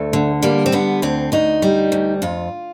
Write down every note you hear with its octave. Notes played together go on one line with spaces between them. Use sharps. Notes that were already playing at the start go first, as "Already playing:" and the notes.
Already playing: D2 A3
D3
G3 A#3
C4
D3 B3
D2 C4
D2 D#4
G3
D2
F2 F4